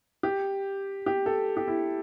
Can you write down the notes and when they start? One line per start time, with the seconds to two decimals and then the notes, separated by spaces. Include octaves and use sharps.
0.23 G4
1.06 G4
1.26 A4
1.57 G4
1.68 E4